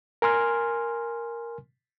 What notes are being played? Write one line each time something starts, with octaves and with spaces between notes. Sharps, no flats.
A#4 G#5 C6 F6